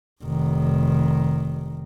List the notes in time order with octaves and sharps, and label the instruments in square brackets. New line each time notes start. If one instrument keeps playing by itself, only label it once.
[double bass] F1 D#3